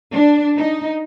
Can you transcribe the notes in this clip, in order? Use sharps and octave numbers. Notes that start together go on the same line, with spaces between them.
D4
D#4